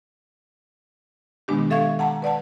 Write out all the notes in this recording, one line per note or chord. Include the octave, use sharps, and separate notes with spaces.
B2 D#3 G#3 B3 D4 G4
A4 E5 F5 C#6 G#6
F#5 A5 A#5
B4 D5 F#5 A5